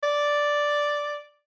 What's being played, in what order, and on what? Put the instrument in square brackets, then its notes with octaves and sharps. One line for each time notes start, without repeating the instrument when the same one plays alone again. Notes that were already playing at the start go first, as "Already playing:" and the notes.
[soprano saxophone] D5